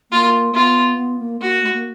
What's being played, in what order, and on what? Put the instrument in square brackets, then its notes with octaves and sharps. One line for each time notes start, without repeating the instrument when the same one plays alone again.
[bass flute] A#3 [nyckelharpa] F4
[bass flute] B3 [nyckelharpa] F4
[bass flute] B3
A#3
[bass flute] A#3 [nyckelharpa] F#4
[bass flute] A3
A#3